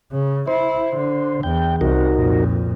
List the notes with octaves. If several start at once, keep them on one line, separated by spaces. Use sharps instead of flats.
C#3
E4 C5
D3
E2 G5
C2 D#4 F#4 A#4
F2 A#2